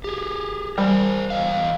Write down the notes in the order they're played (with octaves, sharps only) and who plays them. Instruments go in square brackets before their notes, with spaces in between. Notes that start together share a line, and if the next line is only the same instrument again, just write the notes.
[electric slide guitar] G4 G#4
[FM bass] G3 [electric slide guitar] A#4 C5 G#5
[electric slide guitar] E2 D#5 F5